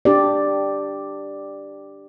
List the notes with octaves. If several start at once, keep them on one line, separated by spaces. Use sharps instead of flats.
D4 G4 D5